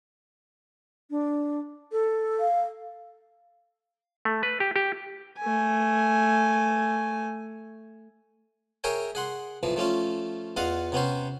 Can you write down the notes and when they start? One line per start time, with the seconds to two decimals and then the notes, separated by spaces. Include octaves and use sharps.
1.11 D4
1.92 A4
2.40 F5
4.25 A3
4.43 B4
4.60 G4
4.76 G4
5.39 A3 G#5
8.84 G#4 A#4 C#5 E5 G5 G#5
9.15 G#4 F#5 C6
9.63 B1 E3 F3
9.76 F3 A3 C#4 F4
10.56 E2 F4 D#5 F5 F#5
10.92 C3 B3 C#4 C5